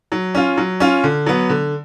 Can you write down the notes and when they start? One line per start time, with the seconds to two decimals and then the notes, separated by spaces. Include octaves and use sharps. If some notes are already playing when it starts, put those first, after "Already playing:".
0.12 F#3
0.35 C#4 F4
0.58 F#3
0.80 C#4 F4
1.04 D3
1.26 F#3 B3
1.50 D3